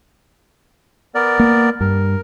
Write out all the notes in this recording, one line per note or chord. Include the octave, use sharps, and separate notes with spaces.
B3 A#4 D5
A#3
G2 A#4